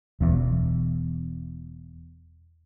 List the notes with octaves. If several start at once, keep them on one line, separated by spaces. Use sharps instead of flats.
E1 E2